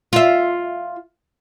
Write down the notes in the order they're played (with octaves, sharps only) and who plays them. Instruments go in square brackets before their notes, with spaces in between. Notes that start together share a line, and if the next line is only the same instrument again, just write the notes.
[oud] F4 E5